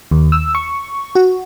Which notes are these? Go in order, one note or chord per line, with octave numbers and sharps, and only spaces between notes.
D#2
E6
C#6
F#4